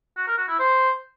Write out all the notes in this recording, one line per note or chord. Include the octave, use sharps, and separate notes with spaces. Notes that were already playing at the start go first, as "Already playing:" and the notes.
F#4
A#4
F#4
E4
C5